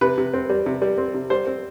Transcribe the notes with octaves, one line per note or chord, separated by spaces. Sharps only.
C3 B4
C3
C4
G3
C3
G3
C4
C3
G3 C5
C4